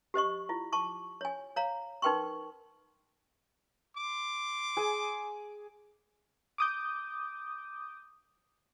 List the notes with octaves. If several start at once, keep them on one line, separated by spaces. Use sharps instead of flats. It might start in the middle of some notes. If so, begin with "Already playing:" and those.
G4 C5 D#5 C#6
E4 F4
A5 C#6 D6
C#5 G#5
C#5 F5 A#5
D#4 A#4 B4 G5 C6 C#6
C6 D6
G#4 G#5
D6 D#6 G6